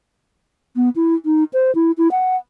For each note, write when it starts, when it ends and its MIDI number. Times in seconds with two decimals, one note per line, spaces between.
0.76 0.89 59
0.96 1.15 64
1.25 1.44 63
1.53 1.74 72
1.75 1.91 64
1.98 2.11 64
2.11 2.36 78